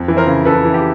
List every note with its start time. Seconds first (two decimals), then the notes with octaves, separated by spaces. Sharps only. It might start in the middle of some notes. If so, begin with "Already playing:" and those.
Already playing: F2
0.08 E3
0.17 A#4 C5
0.27 C#3
0.45 E3 A4 B4
0.65 E3
0.74 G4